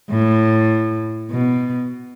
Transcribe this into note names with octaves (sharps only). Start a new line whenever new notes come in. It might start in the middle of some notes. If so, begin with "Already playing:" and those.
A2
B2